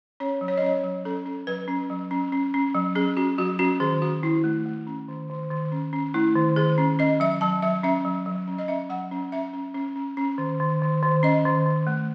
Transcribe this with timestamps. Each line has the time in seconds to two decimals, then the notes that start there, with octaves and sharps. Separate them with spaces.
0.20 C#4 C#5
0.41 F#3
0.48 C#5
0.57 D#5
0.62 C#4 C#5
0.84 F#3
1.05 C#4 A4
1.26 C#4
1.47 F#3 B4
1.68 C#4
1.90 F#3
2.11 C#4
2.32 C#4
2.54 C#4
2.74 F#3
2.95 C#4 G#4
3.17 C#4 F#4
3.38 F#3 F#4
3.59 C#4 F#4
3.80 D#3 G#4
4.02 C#4 F#4
4.23 D#3 E4
4.44 A3
4.66 A3
4.87 C#4
5.09 D#3
5.30 D#3
5.51 D#3
5.72 C#4
5.93 C#4
6.14 A3 E4
6.35 D#3
6.56 D#3 G#4
6.78 C#4
6.99 C#4 D#5
7.20 F#3 E5
7.41 F#3 A5
7.62 F#3 E5
7.83 C#4 E5
8.05 F#3
8.26 F#3
8.47 C#4
8.58 D#5
8.68 C#4 E5
8.89 F#3 F#5
9.11 C#4
9.32 C#4 E5
9.53 C#4
9.74 C#4
9.96 C#4
10.17 C#4
10.38 D#3
10.60 D#3
10.82 D#3
11.03 D#3
11.23 C#4 D#5
11.45 D#3
11.66 D#3
11.87 A3